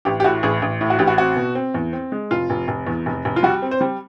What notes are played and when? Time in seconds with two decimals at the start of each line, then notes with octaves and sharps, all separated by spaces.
0.05 A1 G4
0.20 G4
0.24 A2 F#4
0.43 A1 G#4
0.62 A1
0.81 A2
0.90 F#4
0.99 A1 G4
1.08 F#4
1.18 C4 F#4
1.36 B2
1.55 C4
1.74 E2
1.93 C4
2.12 G#3
2.31 F1 F4
2.50 F1
2.68 F1
2.87 E2
3.06 F1
3.25 F1
3.36 F4
3.43 G3 F#4
3.62 C4
3.71 C5
3.81 G3